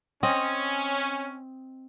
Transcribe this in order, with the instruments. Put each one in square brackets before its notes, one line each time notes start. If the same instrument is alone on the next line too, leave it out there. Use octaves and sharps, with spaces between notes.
[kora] C4 D#5 [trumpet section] C#4